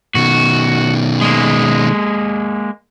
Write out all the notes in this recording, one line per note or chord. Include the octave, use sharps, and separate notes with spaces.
B2 D#3 F#4
G#3 A#3